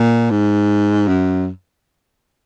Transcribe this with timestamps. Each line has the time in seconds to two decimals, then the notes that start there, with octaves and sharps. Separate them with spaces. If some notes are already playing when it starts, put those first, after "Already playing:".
Already playing: A#2
0.31 G#2
1.08 F#2